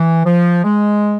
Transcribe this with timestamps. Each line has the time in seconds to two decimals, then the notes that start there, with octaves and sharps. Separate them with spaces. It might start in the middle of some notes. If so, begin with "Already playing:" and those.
Already playing: E3
0.25 F3
0.64 G#3